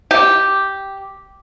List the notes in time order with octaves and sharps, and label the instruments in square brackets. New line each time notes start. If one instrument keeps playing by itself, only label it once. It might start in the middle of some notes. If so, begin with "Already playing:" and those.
[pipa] G4